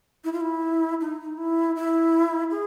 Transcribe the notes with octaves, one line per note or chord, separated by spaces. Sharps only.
E4
F4
E4
D#4
D#4
E4
E4
G#4